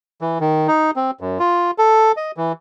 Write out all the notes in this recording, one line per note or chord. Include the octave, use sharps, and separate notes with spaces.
E3
D#3
D#4
C4
F#2
F4
A4
D#5
E3